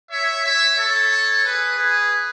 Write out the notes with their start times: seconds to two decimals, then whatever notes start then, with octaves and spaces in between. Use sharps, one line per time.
0.10 C#5 E5
0.44 C#5 E5
0.77 A4 C#5
1.45 G#4 B4
1.78 G#4 B4